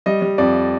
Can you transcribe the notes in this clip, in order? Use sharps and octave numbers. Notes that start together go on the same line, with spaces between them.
G3 D#5
G3
F2 D5